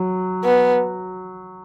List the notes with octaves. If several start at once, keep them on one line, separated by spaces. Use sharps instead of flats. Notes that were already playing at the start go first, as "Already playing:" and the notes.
Already playing: F#3
B3